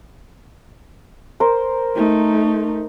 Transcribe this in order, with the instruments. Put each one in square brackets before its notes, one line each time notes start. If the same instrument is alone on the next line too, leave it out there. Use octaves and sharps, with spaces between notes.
[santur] A#4 C5
[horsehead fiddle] A3 D#4